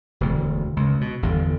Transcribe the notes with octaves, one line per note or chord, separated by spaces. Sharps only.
E1 D2
C#2
B2
G1 E2 D3